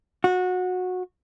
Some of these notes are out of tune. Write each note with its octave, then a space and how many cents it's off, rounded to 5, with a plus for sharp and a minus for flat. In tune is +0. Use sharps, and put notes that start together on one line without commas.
F#4 -20